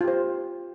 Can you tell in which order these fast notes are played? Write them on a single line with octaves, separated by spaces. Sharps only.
F4 G4 C5